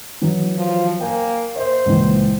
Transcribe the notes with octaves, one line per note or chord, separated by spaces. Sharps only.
E3 F#3
F3
A#3 G5 G#5
C5 D#5 E5
C#2 A#2 E3